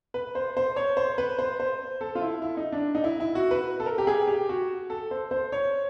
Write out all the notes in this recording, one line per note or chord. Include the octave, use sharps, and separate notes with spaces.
B4
C5
C5
C#5
C5
B4
C5
C5
A4
F4
E4
E4
D#4
D4
D#4
E4
E4
F#4
B4
A4
A#4
G4
G#4
G4
F#4
A4
C5
C5
C#5